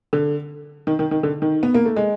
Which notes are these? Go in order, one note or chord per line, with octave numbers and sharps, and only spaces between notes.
D3
D#3
D#3
D#3
D3
D#3
B3
A#3
A3
G#3